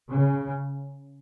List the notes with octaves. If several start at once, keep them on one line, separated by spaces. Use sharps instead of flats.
C#3